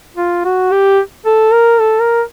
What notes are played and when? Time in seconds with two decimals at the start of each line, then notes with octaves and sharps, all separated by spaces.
0.17 F4
0.45 F#4
0.72 G4
1.26 A4
1.53 A#4
1.80 A4
2.01 A#4